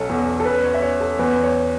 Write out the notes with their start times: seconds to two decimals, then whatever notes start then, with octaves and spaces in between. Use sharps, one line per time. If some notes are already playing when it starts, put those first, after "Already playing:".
Already playing: B1 C#4 A4
0.09 E2
0.40 A4
0.46 C#4 B4
0.64 C#5
0.74 E5
0.82 C#4 C#5
1.01 A4
1.19 E2 B4
1.43 C#5